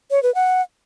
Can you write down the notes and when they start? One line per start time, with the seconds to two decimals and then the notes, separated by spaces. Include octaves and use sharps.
0.11 C#5
0.23 B4
0.35 F#5